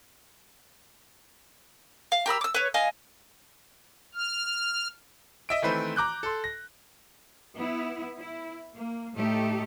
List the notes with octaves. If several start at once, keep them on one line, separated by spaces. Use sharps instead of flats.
F5
G4 A#4 B5 E6
D6 E6
B4 C#5
D#5 F5 G#5
F6
D#5 E5 D7
D#3 E3 A3 C4 B4 C5
A#5 D6 F#6 G6
A4 C6
A#6
B3 E4
E4
A#3
A2 A3 D#4 G4 A4